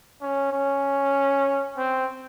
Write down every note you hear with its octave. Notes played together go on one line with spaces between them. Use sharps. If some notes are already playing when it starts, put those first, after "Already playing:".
C#4
C#4
C4